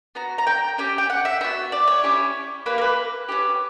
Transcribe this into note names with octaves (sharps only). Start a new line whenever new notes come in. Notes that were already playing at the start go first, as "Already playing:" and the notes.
B3 F#4 A#5
A#5
G5
C#4 G4 G5
G5
F#5
E5
B3 F#4 E5
D5
C#5
C#4 E4 G4
A#3 E4 G4 B4
A#4
B4
C#4 E4 G4